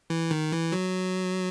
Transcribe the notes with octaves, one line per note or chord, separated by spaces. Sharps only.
E3
D#3
E3
F#3